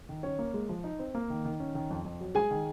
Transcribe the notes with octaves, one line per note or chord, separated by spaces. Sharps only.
D#3
C#4 C#5
A#3
G#3
F3
D#4
C4
A#3
D#3
D#3
C#4
D#3
F2
F2
F#3
G#3 G#4 G#5
D#3